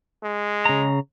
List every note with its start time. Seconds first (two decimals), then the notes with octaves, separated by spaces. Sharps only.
0.23 G#3
0.65 C#3 A#5